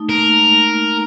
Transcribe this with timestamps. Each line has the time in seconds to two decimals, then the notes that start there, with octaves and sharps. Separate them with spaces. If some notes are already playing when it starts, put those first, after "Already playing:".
Already playing: A3 D#4
0.09 A#3 A#4
0.24 A#3
0.38 G#3